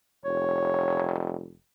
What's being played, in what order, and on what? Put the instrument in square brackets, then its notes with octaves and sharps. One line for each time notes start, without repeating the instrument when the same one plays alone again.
[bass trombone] F1 [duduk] C#5